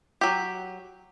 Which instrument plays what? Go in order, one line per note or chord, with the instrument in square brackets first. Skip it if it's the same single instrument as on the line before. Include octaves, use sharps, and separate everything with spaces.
[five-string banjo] F#3 G4